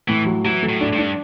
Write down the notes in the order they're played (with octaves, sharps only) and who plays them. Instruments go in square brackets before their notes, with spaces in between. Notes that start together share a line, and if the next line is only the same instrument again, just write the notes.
[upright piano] A2 [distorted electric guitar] E3
[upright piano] F#3
[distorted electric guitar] E3 [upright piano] F#3
[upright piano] A3
[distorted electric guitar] A2
[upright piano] D4
[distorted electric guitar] G2
[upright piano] D4